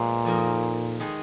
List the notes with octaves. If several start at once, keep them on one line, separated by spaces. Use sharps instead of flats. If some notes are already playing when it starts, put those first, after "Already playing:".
Already playing: A#2 F3 G#3 B3
F2 F3 A#3 D#4 A#4
D#3 G#3 D#4 G#4